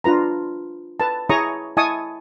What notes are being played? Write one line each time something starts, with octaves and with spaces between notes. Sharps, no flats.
D4 F4 B4 A#5
B4 A5
E4 G#4 C#5 A#5 C#6 D#6
E4 D#5 G#5 A5 C#6 D#6